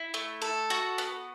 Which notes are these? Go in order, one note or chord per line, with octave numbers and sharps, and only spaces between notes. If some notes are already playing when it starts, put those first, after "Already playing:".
Already playing: E4
A3
A4
F#4
B3